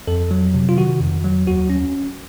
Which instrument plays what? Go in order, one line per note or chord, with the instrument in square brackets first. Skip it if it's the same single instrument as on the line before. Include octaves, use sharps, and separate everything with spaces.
[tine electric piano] F2 A4
F#3
C3
F4
D#3 F#4
F2
F#3
D#2 F#4
C#4